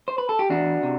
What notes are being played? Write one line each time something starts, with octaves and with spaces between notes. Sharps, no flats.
C5
B4
A4
G4
E2 D4 F#4
C3